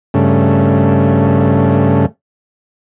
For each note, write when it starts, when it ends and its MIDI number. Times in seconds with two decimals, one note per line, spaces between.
0.14 2.06 43
0.14 2.06 49
0.14 2.06 57